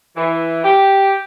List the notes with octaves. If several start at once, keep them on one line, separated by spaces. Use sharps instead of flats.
E3
G4